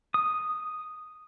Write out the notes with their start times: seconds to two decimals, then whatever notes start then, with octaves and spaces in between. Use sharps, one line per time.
0.14 D#6